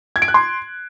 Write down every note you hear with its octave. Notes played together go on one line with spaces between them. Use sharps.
G#6
D7
F#6
C6